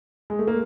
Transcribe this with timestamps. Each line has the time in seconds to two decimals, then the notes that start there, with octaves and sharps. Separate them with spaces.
0.30 G#3
0.39 A3
0.47 A#3